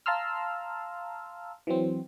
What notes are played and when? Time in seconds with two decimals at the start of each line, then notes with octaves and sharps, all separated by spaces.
0.06 F5 A5 A#5 C6 E6 F6
1.67 E3 F#3 C4